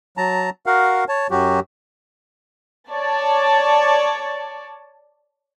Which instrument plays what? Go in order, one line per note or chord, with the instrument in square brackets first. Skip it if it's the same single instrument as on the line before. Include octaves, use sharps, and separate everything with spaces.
[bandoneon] F#3 A5 A#5
F#4 A#4 F5 F#5
C#5 A5
F#2 F#3 F#4 G4
[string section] C#5 D5 A5